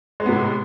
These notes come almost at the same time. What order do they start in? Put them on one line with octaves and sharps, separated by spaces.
G#3 C4 B3 C3 A2